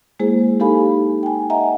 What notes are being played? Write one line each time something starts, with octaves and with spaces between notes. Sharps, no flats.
G#3 A#3 E4 G#4 C5
D#4 G4 A4 F5 G#5 B5
G5 G#5
D#5 E5 F#5 G#5 A#5